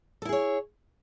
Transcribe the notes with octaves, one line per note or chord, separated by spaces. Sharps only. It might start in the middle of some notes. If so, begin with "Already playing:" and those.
E4 G#4 A4 C#5